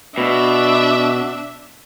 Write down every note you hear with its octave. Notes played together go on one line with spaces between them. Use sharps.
B2 D4 E5